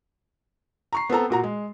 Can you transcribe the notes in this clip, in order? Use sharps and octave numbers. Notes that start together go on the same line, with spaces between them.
A#5 C#6 C7
B3 C4 A4 A#5
A#2 F#4 A#5
G#3